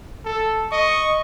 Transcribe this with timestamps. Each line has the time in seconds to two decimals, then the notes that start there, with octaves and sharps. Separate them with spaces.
0.25 A4
0.72 D#5 C#6